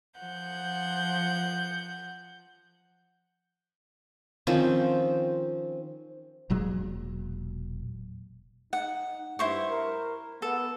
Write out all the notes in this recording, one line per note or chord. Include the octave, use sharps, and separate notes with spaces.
F3 F#5 G6
D#3 F3 C4 C#4
E1 A#2 F#3 G#3
D#4 F#5
G2 E4 C5 C#6
A#4
B3 A4